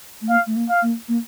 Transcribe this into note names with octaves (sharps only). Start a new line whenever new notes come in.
A3
A#3 F5
A3
A#3
F5
A#3
A#3